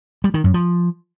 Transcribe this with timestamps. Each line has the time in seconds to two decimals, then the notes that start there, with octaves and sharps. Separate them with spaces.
0.24 G3
0.34 D#3
0.44 F#2
0.54 F3